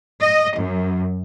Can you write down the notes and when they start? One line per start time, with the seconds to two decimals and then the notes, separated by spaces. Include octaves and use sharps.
0.21 D#5
0.56 F#2